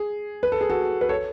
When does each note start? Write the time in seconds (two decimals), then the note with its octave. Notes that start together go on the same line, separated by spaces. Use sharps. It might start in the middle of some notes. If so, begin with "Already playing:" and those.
Already playing: G#4
0.43 B4
0.52 A4
0.61 G#4
0.70 F#4 A4
1.01 B4
1.09 A4 C#5